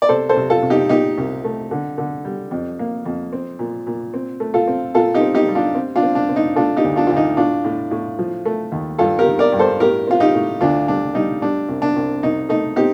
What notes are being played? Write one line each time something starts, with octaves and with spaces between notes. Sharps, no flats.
D5
C3 A4 C5
A4 C5
C3
F4 A4
C3
D#4 G4
A#2 D#4 G4
C2
A3
D3
D3
G3
F2
A#3
F2
C4
A#2
A#2
C4
A3
F4 A4
C4
A#2 F4 A4
D#4 G4
C4
D#4 G4
G3
D4 F4
C4
D4 F4
C4
D4
C4
D#4
A3 D4 F4
D#4 G4
D2
D4 F4
D2 F4
D#4
A2 D4 F4
A2
A2
F3
A3
D#2
G2 F4 A4
G4 A#4
D#3
A#4 D5
G2
A4 C5
A2 G4 A#4
C4 F4
D#4 G4
A2
D2 D4 F4
G3 D4
G3 D#4
G3 D4
C2
D4
C2
C2 D#4
A3 D#4
C4 D#4 G4